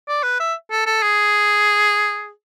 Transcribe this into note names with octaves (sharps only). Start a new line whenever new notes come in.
D5
B4
E5
A4
A4
G#4